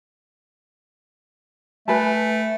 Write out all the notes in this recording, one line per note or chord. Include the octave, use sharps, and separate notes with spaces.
A3 B4 G#5 A5